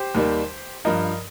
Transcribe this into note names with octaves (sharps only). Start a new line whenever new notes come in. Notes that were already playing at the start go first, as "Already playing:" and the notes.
Already playing: G4 C5
D#2 D#3 G3
G2 F3 A#4 D#5